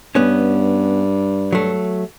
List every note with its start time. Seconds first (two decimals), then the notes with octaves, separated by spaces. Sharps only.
0.15 G2 B3 C#4
1.53 F#3 A3